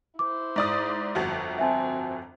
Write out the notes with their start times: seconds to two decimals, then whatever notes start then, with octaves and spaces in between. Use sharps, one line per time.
0.19 E4 C5 D6
0.56 G#2 D5 D#6
1.15 G1 F2 F#4
1.59 C4 E5 G#5 A5